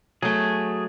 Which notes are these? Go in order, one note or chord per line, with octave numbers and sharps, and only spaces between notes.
F#3 A3 G#4